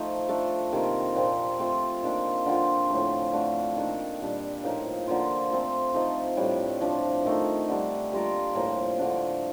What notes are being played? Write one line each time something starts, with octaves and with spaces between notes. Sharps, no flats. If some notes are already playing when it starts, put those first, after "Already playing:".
Already playing: F3 A3 D#4
A3 D4 A4
C3 D#3 A#3 F4
A#2 F3 C4
A3 C4 F4 A4
D#3 A#3 D4 F4
D3 F3 C4 F4
A2 F3 A3
D3 A3 D4 F4
D#3 A#3 D4 A4
A#2 G3 D4
A2 F3 A#3 D#4
D3 F3 A#3 F4
F3 A3 C4 F4
F3 A3 D#4 A4
A2 G3 D4
F3 A3 D4
D#3 A3 D#4
D3 G3 D4
G3 A#3 F4 A#4
A2 F3 A#3
D3 A3 D4